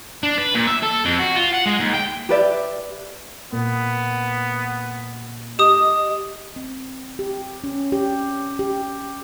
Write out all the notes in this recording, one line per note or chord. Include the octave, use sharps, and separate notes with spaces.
D4
B4
A#2
E5
A4
F2
F#4
F4
F#5
G#3
D#2
G5
G4 B4 D5 E5
A#2 B3
G4 D#5 D#6
C4
G4
C#4
G4
G4